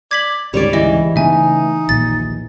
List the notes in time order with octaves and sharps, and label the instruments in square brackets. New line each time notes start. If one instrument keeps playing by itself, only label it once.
[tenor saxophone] D5 [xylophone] G#6 B6 F#7
[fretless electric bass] D2 G#2 C#3 [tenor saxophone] G3 [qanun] C#5 D5
[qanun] E3 [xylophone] D#5
[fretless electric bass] C#3 A3 B3 [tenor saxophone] D#4 [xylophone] E5 G#5
[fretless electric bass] A#1 D#2 A#2 [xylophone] A6